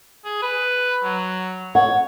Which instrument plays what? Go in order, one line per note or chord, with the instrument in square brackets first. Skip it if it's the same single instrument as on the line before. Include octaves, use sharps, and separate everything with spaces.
[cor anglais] G#4
B4
F#3
[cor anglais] C#5 [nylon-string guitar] F#5